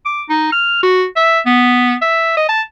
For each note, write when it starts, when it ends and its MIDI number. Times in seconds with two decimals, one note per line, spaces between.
0.06 0.23 86
0.29 0.51 63
0.52 0.79 89
0.83 1.04 66
1.16 1.40 76
1.46 1.95 59
2.02 2.37 76
2.37 2.47 75
2.49 2.62 81